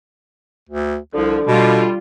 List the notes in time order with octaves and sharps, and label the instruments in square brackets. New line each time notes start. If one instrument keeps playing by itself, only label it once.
[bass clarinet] D2
[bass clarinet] C2 [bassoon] D3 [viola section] F3
[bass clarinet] B2 [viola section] G3 F4